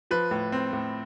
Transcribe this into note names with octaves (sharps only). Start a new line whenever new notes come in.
F3 B4
A2
C4
A2